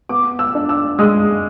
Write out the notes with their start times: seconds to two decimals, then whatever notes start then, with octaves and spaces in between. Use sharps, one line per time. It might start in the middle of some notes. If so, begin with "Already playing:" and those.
0.09 B3 D6
0.39 E6
0.55 D4
0.69 E6
0.99 G#3 D#6